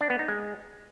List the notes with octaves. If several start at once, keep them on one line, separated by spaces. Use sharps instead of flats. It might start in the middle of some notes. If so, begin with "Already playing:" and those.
D4
B3
D#4
G#3